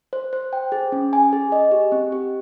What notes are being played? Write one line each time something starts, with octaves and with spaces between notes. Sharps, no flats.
C5
C5
G5
G#4
C#4
G#5
G#4
D#5
G4
C4
G4